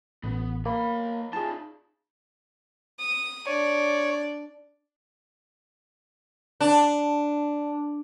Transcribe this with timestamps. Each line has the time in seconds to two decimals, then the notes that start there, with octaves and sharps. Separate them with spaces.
0.24 A1 B3
0.66 F#3 A#3 B5
1.33 D#4 F4 G#4 A5
3.00 D#6
3.47 D4 C#5 D5
6.61 D4